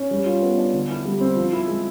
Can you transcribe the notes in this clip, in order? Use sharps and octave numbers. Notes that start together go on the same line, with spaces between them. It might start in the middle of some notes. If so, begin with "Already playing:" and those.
Already playing: C#4
G3
F4
B3
D4
D3
E4
G3
C4
F3
E4
G#3